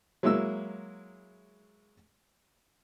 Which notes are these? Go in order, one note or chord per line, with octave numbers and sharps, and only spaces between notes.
F#3 G#3 A#3 E4 E6